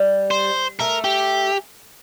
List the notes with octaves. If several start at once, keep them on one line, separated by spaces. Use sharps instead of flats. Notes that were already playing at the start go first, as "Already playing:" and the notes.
Already playing: G3
C5
A3 A#4
G4